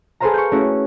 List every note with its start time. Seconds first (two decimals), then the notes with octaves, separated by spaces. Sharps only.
0.20 G#4 A4 B4 C5 F5 A#5
0.33 C#6 G6
0.51 A3 C#4 E4 F#4 G#4